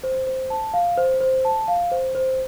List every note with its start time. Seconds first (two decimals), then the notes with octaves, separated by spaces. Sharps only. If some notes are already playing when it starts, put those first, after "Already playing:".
0.04 C5
0.27 C5
0.50 A5
0.73 F5
0.97 C5
1.21 C5
1.45 A5
1.68 F5
1.92 C5
2.15 C5